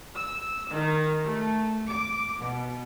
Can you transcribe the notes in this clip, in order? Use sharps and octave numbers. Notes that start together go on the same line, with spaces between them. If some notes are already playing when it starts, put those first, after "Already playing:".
E6
D#3
A3
D6
B2